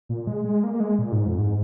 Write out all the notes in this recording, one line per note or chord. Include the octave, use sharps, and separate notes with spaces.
A#2
G#3
G#3
A#3
A#3
G#3
A#2
G#2
F2
G#2